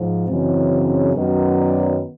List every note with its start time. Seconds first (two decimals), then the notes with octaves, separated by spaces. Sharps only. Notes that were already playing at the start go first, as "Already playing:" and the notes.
Already playing: G#2 F3
0.27 F#2 C#3 E3 G#3 C4
1.13 F#2 D#3 F#3 B3
1.56 D5